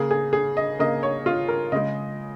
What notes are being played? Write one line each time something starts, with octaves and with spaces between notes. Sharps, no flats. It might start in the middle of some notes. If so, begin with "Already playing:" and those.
Already playing: C#3 A#3 G#4
G#4
G#4
D#5
C#3 A#3 D#5
C#5
F4
A#4
C#3 G#3 D#5